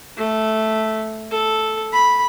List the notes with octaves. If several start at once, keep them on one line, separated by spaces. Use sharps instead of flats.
A3
A4
B5